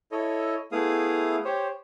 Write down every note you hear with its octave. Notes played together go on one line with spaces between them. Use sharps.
E4 A4 C#5 D#5
A3 B3 E4 G#4 F5 D#6
G4 C5 C#5